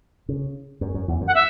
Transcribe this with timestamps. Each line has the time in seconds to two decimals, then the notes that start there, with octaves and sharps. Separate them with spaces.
0.29 C#3
0.81 F#2
0.94 F#2
1.08 E2
1.21 F#2
1.27 F#5
1.34 E5